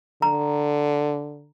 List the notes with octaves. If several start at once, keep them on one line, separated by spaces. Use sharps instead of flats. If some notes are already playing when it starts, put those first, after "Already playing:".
D3 A#5